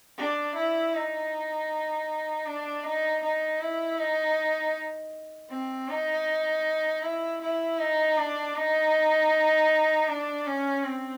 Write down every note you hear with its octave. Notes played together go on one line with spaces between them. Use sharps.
D4
E4
D#4
D4
D#4
D#4
E4
D#4
C4
D#4
E4
E4
D#4
D4
D#4
D4
C#4
C4